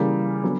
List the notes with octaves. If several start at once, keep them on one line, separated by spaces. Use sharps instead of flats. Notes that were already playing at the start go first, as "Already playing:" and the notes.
Already playing: C#3 E3 G3 A#3
D3 F#3 B3